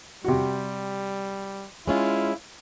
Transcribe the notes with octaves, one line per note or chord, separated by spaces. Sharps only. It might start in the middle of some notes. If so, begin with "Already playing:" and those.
C3 G3 F#4
G#3 C#4 E4 F4